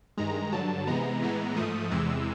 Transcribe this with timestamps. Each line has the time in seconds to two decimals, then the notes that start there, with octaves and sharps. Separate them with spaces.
0.17 G2 D#3 G#3 A#5
0.52 G2 D3 F#3 A5
0.87 C3 E3 G#3 B3 A#5
1.22 A2 E3 G#3 B3
1.57 G#2 F3 A3 D#6
1.91 E2 C3 E3 G#3 E6